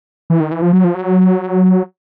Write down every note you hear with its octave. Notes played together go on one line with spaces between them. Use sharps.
E3
D#3
E3
F3
F#3
F3
F#3